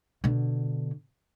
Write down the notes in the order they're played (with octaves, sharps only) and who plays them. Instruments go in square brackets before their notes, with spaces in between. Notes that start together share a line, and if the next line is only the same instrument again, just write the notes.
[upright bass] B2 D3